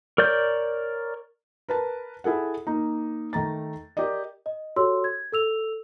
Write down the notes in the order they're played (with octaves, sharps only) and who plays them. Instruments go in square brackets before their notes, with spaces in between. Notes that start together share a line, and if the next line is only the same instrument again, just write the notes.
[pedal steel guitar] A#4 C#5 D5 G6
[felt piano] A#4 B4 A5
E4 G#4 A4 F#5
A#3 D#4
D#3 A3 A#5 A6
G4 A#4 D5 D#5
[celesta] D#5
F#4 G4 A4 C#5 C6 E6
G#6
A4 E6 F7